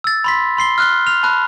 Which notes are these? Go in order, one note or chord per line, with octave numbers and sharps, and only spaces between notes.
E6 A6
B5 C6 B6
B5 C6 C7 G7
F6 F#6 G7
F6 F7
A5 B5 F#6